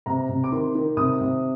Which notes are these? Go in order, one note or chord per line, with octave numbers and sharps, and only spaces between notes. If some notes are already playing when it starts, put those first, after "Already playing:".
C3 A#5
C3
D6
D#3 C6
D#3
C3 D#6
C3